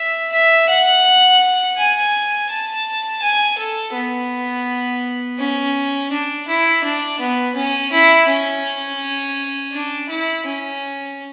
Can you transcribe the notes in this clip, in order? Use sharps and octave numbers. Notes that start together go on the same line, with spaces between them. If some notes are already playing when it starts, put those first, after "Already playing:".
Already playing: E5
E5
F#5
G#5
A5
G#5
A4
B3
C#4
D4
E4
D4
B3
C#4
E4
C#4
D4
E4
C#4